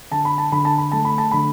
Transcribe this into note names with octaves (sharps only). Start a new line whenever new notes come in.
D3 A5
B5
A5
D3 B5
A5
B5
A3 A5
B5
A5
D3 B5